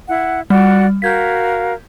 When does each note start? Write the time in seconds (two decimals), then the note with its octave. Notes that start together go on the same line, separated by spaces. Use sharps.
0.08 E4 F#5
0.50 G3 F#4 D5 F#5
1.02 F#4 A#4 F5 G6 G#6 B6